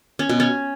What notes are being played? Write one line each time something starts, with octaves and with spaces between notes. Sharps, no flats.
C#4
B2
C#4